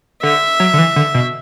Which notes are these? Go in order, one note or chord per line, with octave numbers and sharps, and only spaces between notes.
D3 E5
F#3
D3
E3
D3
B2